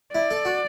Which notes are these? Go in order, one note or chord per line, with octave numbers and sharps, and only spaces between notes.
E4 D5
A4
F#4